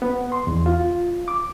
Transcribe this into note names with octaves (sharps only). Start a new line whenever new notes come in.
B3
C6
E2
F4
D6